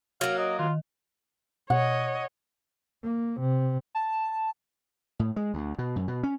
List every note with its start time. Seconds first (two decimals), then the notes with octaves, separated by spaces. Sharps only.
0.21 F#3 A#3 F5
0.38 D#5
0.59 D#3 F4
1.70 B2 C#5 D#5 F#5
3.03 A#3
3.40 C3
3.95 A5
5.19 A2
5.36 G#3
5.54 D2
5.78 B2
5.96 F#2
6.08 B2
6.23 C#4